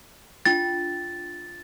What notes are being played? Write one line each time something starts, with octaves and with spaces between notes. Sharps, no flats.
D4 F4 G5 A6